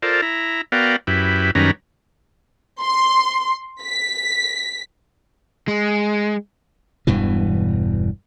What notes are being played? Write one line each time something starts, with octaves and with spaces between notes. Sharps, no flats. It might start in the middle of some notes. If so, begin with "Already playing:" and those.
F4 A4 A#4 C5 D5
E4 A#5
B3 F#4 A#4 D5 F5 G5
F#2 E4 G4 B4
F#2 D#3 G3 C#4 B4 A#5
C6
B6
G#3
E1 G2 B2 E3